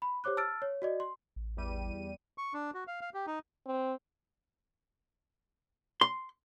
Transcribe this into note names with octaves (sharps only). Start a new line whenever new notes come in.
B5
G4 C5 C#5 D6 F#6
A5 E6 F6 A6 D7
C#5
F#4 D5 D#5
C6
A1
E2 G3 D#7
C#6
D4
F#4
F5
F5
G4
D#4
C4
C6